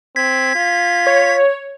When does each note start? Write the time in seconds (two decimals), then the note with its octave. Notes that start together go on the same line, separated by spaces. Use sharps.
0.16 C4 G#6 B6
0.55 F4
1.07 C#5